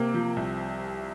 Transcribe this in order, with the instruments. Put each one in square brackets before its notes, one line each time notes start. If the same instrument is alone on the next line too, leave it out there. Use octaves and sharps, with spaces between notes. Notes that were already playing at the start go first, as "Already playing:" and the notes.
Already playing: [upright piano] C3 C4 [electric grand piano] A#3
[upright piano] F3
C2